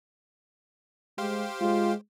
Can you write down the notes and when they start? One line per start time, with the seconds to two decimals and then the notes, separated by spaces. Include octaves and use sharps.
1.18 G#3 G4 C5 F5
1.61 G#3 F4